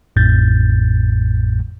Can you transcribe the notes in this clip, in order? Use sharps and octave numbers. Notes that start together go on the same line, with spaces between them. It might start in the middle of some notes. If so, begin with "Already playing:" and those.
A1 F2 A2 G6 A6